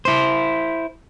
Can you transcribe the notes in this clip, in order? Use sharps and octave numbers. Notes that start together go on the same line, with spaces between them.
E4 C5